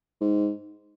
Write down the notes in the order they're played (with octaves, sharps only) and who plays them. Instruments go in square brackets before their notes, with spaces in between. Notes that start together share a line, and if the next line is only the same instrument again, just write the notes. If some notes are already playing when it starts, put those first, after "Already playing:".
[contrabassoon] G#2